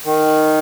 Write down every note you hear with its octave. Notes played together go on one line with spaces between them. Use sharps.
D#3